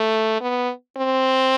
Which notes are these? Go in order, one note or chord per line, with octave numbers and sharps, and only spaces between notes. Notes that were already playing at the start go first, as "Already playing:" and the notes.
Already playing: A3
B3
C4